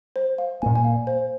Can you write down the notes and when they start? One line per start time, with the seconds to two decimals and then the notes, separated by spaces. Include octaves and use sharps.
0.16 C5
0.38 F5
0.62 A#2 A#3 G#5
0.76 G#5
0.84 F5
1.07 C5